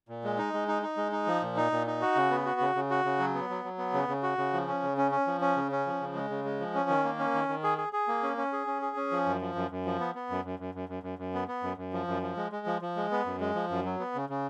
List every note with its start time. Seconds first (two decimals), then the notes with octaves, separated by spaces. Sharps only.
0.09 A#2
0.24 G#3
0.38 D#4
0.54 G#3
0.68 D#4
0.82 D#4
0.97 G#3
1.12 D#4
1.27 F3
1.42 A#2
1.57 D#4
1.72 A#2
1.87 D#4
2.01 F#4
2.16 C#3
2.31 B3
2.45 F#4
2.60 C#3
2.75 C#3
2.90 F#4
3.05 C#3
3.19 F#3
3.34 B3
3.50 F#3
3.64 F#3
3.78 B3
3.93 C#3
4.08 C#3
4.23 F#4
4.38 C#3
4.53 F3
4.67 C#4
4.83 C#3
4.97 C#4
5.12 C#4
5.27 F3
5.41 C#4
5.56 C#3
5.72 C#4
5.86 F3
6.01 C#3
6.15 G#3
6.30 C#3
6.44 G#3
6.60 F3
6.75 C#4
6.90 D#3
7.04 A#3
7.19 C#4
7.34 D#3
7.48 D#3
7.64 G#4
7.78 G#4
7.93 G#4
8.08 A#3
8.23 C#4
8.37 C#4
8.52 G#4
8.67 C#4
8.82 G#4
8.96 C#4
9.12 F3
9.26 F#2
9.41 F3
9.55 F#2
9.71 F#2
9.85 F3
10.00 B3
10.15 B3
10.30 F#2
10.45 F#2
10.59 F#2
10.75 F#2
10.89 F#2
11.03 F#2
11.19 F#2
11.34 B3
11.48 B3
11.63 F#2
11.77 F#2
11.93 F3
12.08 F#2
12.22 F3
12.37 G#3
12.52 G#3
12.67 F3
12.82 F3
12.96 G#3
13.11 B3
13.26 F#2
13.40 G#3
13.55 F3
13.70 F#2
13.85 F#3
13.99 B3
14.15 C#3
14.29 C#3